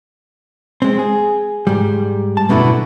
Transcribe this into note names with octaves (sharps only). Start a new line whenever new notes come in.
G#3 C4
G#4
G#2 G3
A5
F#2 B2 D3 A3 B3 E4